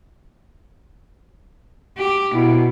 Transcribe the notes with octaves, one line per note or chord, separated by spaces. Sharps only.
G4
B2 E4